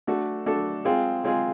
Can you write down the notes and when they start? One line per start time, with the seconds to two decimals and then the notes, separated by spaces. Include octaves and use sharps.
0.07 A3 D4 F#4 A4
0.46 A3 D4 F#4 A4
0.85 G#3 C4 F4 G#4
1.24 G#3 C4 F4 G#4